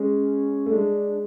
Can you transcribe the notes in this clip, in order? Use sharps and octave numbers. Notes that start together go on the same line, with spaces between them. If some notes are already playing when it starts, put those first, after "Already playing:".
Already playing: G#3 C#4
A3
G#3 D4